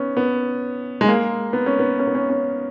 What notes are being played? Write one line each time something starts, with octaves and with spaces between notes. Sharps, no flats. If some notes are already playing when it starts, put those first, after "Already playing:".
Already playing: B3 C#4
B3
G#3
A#3
B3
C#4
B3
C#4
B3
C#4
C#4